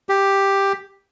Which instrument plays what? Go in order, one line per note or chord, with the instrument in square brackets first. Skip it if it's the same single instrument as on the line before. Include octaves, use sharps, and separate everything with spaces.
[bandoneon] G4